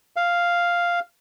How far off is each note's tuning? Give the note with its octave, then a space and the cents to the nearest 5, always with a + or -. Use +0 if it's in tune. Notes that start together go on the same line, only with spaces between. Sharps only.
F5 +0